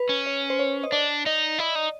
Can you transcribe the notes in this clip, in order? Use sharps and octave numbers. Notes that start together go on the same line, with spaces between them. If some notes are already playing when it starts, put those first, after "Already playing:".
Already playing: B4
C#4
C#5
C5
C#5
D#5
D4 D5
D#4 D#5
E4 D#5
D#4